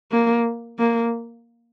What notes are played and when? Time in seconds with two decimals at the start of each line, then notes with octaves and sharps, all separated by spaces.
0.12 A#3
0.79 A#3